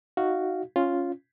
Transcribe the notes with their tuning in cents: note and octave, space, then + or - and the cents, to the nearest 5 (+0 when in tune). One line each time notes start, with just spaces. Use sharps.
D#4 +15 F#4 +0 F5 -10
C#4 +0 F4 +0